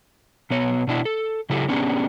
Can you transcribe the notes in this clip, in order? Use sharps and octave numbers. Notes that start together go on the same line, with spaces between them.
B2 B3 C#5
B2 D4 E4 F#4
A4
C#3 F#3 E4 G4 A4
B3 C#4 D4 G4 G#4